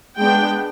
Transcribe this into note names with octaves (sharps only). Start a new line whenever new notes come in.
G#3 B3 D4 G5